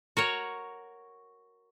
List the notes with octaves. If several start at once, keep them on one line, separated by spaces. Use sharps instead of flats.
F#4 A#4 C#5